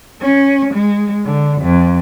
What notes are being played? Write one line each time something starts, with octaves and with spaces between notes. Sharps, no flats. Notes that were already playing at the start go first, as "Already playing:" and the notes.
C#4
G#3
D3
F2